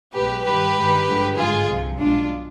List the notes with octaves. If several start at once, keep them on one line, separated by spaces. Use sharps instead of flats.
B1 B2 G#3 G4 B4
G2 D#3 G3 G4 B4
G2 D#3 G#3
G#1 G2 D3 F3 G#3
G#1 G2 F3 G#3 F4 G#4
C2 C3 F3
B1 B2 G#3 D4 F4